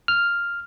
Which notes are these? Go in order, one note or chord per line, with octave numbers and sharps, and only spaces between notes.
F6